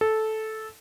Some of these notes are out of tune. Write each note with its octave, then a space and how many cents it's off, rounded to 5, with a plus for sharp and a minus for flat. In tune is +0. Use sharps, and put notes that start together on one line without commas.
A4 -10